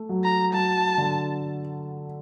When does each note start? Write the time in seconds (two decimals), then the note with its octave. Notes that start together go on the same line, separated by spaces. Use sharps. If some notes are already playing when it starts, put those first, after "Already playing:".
Already playing: A3
0.09 F#3
0.24 A#5
0.53 F#3 A5
0.98 D3